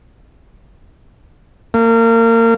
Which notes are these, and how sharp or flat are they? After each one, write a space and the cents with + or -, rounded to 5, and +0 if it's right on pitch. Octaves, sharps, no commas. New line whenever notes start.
A#3 -30